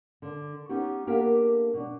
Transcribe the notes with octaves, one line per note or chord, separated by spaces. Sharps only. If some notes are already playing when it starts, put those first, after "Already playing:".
D3
B3 C#4 D#4 G4
A#3 B3 D4 G4 A4 A#4
B2 D4